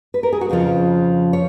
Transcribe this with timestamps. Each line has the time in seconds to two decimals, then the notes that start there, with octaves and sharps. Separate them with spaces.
0.14 B4
0.23 A#4
0.33 G#4
0.41 F#4
0.49 F2 C#3 F3 F4
1.33 C#5